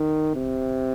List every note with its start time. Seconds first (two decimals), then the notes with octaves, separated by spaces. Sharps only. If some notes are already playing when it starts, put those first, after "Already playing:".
Already playing: D#3
0.35 C3